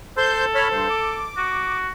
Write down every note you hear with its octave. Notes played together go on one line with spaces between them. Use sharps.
A4 C5 C6 G6
C#5 B5 F6
G2 C5
D6
F#4